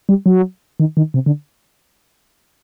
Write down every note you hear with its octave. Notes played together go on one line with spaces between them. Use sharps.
G3
F#3
D#3
D#3
C3
D3